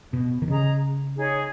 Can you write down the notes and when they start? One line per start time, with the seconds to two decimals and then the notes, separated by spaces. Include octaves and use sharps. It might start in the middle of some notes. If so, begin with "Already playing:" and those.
0.13 B2
0.42 D#3
0.48 C#3 G#4 D#5 A#5
1.16 D#4 G#4 C#5